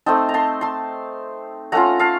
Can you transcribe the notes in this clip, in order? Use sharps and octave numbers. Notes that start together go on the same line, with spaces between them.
A3 C4 D#4 A5 C6
A#5
A5 C6
A5 C6
A3 C#4 F4 F#5 A#5
F5 A5